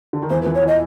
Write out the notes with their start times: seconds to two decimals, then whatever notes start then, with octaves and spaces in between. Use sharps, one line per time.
0.13 D3
0.22 D#3
0.30 E2 E3 C5
0.41 F3 B4
0.46 E2 E3
0.55 C#5
0.63 E3 D#5